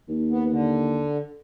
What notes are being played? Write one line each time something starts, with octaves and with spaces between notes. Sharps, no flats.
D#2
B3
D3